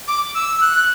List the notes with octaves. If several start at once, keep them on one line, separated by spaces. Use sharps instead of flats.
D6
E6
F#6